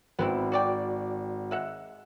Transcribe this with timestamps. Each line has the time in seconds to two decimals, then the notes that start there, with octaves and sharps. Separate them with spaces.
0.19 G#1 B3 C4 E4
0.52 F#4 D5 G5
1.51 G#3 E5 F#5